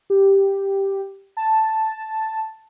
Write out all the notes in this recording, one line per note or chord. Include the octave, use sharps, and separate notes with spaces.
G4
A5